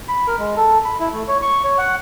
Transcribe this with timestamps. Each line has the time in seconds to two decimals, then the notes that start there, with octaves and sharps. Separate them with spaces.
0.08 B5
0.28 A#4
0.39 G#3
0.56 A4
0.85 B5
1.00 E4
1.14 A3
1.28 C#5
1.42 C#6
1.64 C#5
1.78 F#5